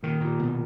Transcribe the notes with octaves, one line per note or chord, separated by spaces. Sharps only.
A#2 D#3
A#2
B2